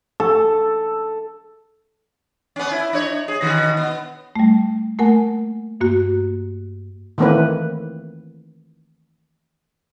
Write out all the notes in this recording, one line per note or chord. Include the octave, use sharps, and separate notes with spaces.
A4
B3 C#4
E4
D4 C#5
G#4
B2 D#3
B3
G3 A3
A3 A#3 A#4 F#5 G#5
G2 A#3 F#4
D#3 E3 A3 A#3 C4 B4